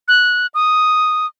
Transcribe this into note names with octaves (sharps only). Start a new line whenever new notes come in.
F#6
D#6